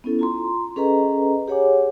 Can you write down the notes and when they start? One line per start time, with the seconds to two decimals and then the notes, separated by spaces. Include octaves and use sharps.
0.04 B3 C#4 E4 A4
0.19 F4 A#5 C6
0.76 C#4 G#4 A4 B4 D#5 A#5
1.48 G4 G#4 C#5 F#5 G#5 D6